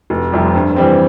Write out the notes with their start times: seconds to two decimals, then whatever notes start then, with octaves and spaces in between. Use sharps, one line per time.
0.10 F1
0.32 F2 C3 G3
0.55 G2
0.76 E3 G3 C4